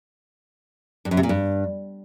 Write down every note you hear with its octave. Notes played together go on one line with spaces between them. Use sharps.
G2
F#2
C3
A#2
G2